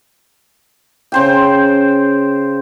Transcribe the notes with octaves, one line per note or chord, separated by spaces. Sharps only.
C#3 C5 G5